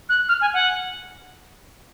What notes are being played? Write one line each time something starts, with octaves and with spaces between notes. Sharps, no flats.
F#6
F6
G#5
F#5